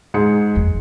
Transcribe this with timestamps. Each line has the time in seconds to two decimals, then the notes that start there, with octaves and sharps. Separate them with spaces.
0.14 G#2 G#4 C#7
0.55 F#1 E2